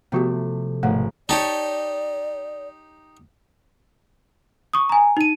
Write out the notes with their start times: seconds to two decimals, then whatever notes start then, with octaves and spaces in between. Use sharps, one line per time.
0.12 C3 F3 A3 B3 F#4 G4
0.83 G#1 B2 F3 G#3 A3 F#5
1.29 D#4 G4 C#5 D5 A5
4.73 C#6 D#6
4.89 G#5 A#5
5.17 D#4 D#7